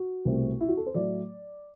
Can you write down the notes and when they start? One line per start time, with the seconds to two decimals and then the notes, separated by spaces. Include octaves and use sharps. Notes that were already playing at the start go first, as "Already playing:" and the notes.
Already playing: F#4
0.25 C2 B2 A3 C4
0.60 E4
0.68 F#4
0.77 A4
0.86 C5
0.94 A2 F#3 A3 D5